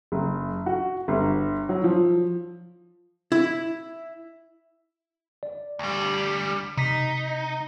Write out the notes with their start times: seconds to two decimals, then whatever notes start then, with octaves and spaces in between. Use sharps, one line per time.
0.12 F#1
0.66 F#4
1.08 G1
1.69 F#3
1.84 F3
3.32 E4
5.43 D5
5.79 D2 G3
6.77 C3 D#4 B6